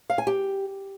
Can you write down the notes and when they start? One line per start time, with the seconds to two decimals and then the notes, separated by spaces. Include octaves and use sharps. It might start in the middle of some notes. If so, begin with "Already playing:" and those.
0.10 F5
0.18 G#5
0.27 G4